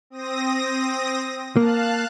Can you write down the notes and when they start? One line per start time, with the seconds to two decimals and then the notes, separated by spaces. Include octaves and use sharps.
0.10 C4 D#6 A#6
1.57 A#3 F5 A5 F#6